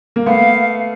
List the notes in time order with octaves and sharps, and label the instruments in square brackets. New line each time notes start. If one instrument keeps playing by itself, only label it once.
[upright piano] A#3
[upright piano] A3 B3 [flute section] F5